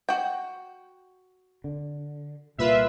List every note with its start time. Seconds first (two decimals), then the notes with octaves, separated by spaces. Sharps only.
0.09 F#4 G5
1.64 D3
2.58 C2 A#2 G3 F4 B4 E5